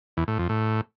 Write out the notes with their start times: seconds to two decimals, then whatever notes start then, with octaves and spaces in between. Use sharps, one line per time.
0.17 E2
0.28 A2
0.38 F2
0.49 A2